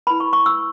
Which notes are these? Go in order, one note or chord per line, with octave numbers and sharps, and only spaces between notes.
E4 B4 B5
C#6
C#6
E6